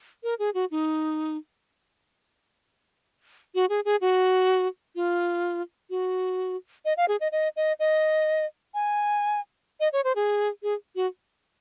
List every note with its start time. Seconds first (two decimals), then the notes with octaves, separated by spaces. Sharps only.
0.23 A#4
0.39 G#4
0.54 F#4
0.71 D#4
3.55 F#4
3.69 G#4
3.85 G#4
4.01 F#4
4.95 F4
5.90 F#4
6.85 D#5
6.97 F5
7.08 G#4
7.21 D#5
7.32 D#5
7.56 D#5
7.80 D#5
8.74 G#5
9.80 D#5
9.93 C#5
10.04 C5
10.16 G#4
10.63 G#4
10.96 F#4